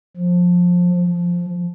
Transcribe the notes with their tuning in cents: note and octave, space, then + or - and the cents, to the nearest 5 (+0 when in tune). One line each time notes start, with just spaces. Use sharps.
F3 +20
F3 +0